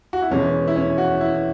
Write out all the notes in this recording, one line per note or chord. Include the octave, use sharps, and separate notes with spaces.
F#4
E4
E1 E2 E3 G#3 C#4
E4
C#4
F#4
E4